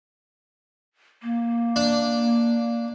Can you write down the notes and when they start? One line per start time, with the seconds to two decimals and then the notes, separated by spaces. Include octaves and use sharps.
1.23 A#3
1.76 D4